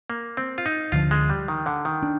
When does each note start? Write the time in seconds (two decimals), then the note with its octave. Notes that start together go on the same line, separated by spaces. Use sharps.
0.10 A#3
0.37 C4
0.58 F4
0.66 D#4
0.92 D2 D3 F3 F4
1.11 G#3
1.29 G3
1.48 D#3
1.66 D3
1.85 D#3
2.03 D4